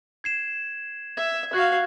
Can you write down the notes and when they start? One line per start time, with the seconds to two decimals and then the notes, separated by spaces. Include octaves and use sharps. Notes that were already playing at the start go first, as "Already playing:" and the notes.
0.24 G#6 C7 E7
1.17 E5 G#6
1.53 F#4 F5 F#6 G#6 C7